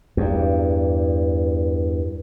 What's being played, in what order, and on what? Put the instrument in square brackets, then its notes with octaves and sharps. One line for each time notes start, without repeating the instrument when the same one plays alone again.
[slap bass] E2 G2